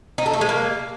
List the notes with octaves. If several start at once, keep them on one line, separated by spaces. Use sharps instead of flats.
D#4
A4
A3
G#3
A#3